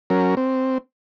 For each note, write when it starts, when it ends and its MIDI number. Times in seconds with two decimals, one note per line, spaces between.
0.10 0.35 54
0.10 0.35 61
0.10 0.35 70
0.37 0.78 60